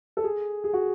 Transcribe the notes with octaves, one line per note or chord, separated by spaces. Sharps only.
A4
G#4
G#4
F#4